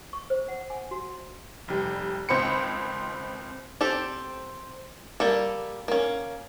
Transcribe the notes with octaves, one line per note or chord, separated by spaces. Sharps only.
C#6
C5
F#5
G#5
F#4
F1 G3
G#1 C#2 C4 C5 B5 C#7
C4 G4 A4
G3 A#3 A4
A#3 C#4